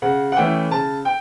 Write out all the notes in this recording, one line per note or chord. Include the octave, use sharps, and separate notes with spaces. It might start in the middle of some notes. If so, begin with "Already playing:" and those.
C#3 F#5
F#5
E3 A3 C#4 E4 G5
C#3 A5
G5